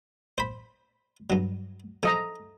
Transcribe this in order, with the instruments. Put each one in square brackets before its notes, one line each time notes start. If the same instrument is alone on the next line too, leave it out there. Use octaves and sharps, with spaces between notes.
[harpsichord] C5 B5
G2 F#3
[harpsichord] F3 [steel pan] A4 D#5 A#5